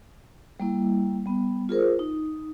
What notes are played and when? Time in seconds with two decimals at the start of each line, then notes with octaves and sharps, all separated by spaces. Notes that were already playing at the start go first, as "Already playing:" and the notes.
0.60 G3 A#3 E4
1.26 G3 B3
1.69 F4 G#4 A#4 C5
1.99 D#4